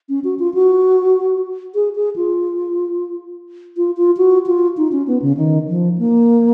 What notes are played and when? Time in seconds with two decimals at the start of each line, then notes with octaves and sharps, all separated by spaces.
0.09 C#4
0.24 F#4
0.39 F4
0.54 F#4
1.75 G#4
1.96 G#4
2.16 F4
3.77 F4
3.97 F4
4.17 F#4
4.47 F4
4.77 D#4
4.92 C#4
5.07 B3
5.22 C#3
5.37 D#3
5.68 F3
5.98 A#3